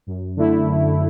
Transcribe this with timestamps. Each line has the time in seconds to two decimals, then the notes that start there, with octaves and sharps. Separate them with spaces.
0.07 F#2
0.36 D3 A3 E4
0.66 F#2